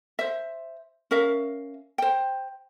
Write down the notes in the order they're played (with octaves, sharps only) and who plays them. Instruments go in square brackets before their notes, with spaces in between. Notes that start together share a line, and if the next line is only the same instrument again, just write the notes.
[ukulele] C5 E5
C#4 A#4 E5 F5
C5 G5